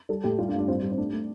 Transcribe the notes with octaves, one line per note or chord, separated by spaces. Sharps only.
G3 A4
A2 G4
G3 F4
D4
G2
D4
G3 C4
G3
C4
A3 D4
A3